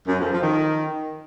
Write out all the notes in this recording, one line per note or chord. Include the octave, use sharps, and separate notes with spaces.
F#2
F2
F3
D#3